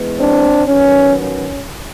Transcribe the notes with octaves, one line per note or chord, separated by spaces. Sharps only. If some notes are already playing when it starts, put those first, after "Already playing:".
Already playing: E3 G#3 B3
C4 D4
D#3 F#3 B3 C#4
C#4